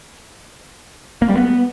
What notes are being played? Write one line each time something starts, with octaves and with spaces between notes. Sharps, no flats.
A#3
G3
B3